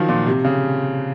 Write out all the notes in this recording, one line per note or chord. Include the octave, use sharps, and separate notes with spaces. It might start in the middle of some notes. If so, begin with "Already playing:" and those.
Already playing: D#3 F3 F#3
A#2
C3
C#3